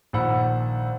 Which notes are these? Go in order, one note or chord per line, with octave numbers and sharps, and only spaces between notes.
A#1 D#3 F#5 B5 E6